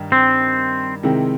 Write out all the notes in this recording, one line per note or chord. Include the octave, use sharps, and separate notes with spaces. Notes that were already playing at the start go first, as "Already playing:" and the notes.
Already playing: G2 D#3
C4
C3 D#3 G#3 C4 E4